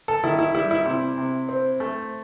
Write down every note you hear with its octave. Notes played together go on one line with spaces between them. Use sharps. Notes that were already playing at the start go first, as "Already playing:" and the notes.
A4
D#3 E4
E4
G3 E4
E4
C3 E4
C3
C4
A3